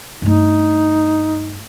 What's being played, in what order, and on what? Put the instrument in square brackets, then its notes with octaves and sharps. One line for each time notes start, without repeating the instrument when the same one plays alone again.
[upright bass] G2 A3 [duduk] D#4